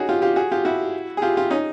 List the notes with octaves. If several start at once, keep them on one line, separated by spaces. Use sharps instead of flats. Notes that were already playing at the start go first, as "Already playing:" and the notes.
Already playing: C#4 D#4 F#4 G#4
F4 G4
F4 G4
F#4 G#4
F4 G4
E4 F#4
G#4
F4 G4
F4 G4
C#4 D#4